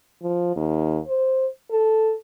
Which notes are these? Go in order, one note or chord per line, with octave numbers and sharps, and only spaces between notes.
F3
D#2
C5
A4